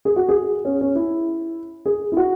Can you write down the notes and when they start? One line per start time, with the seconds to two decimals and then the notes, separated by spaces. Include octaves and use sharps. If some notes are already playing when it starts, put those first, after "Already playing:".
0.05 G#4
0.16 F#4
0.29 G#4
0.65 C#4
0.81 C#4
0.95 E4
1.86 G#4
2.12 E4
2.17 F#4